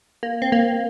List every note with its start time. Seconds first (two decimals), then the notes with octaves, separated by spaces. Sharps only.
0.23 A#3
0.42 C4
0.52 A#3